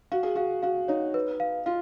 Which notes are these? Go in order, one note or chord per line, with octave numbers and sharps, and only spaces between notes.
F#4 F5
G#4
F#4 F5
F#4 F5
D#4 C#5
B4
F5
F4 F5